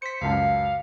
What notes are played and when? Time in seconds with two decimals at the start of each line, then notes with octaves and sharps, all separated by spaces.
0.02 C5 B6 C#7
0.21 C#2 F#2 F5 A5